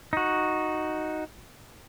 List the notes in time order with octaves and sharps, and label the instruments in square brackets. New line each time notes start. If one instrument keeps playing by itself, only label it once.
[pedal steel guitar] D#4 F#4